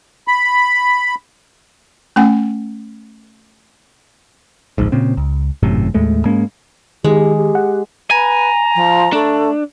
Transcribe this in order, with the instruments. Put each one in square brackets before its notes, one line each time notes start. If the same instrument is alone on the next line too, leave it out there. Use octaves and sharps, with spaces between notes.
[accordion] B5
[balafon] A3 C#4 F#5 G#5
[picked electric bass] D1 A#1 G#2
A#2 C#3 C4
C#2
G#1 F#2 A2 C3
D#2 A2 G#3 A3
G#2 G#3 A#3 C#4
[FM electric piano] D#3 [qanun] G#3 [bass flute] G4
[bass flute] G4
[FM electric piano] F#5
[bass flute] B4 [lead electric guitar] G#5 [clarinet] A#5
[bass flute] F3
[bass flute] A3 [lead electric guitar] D4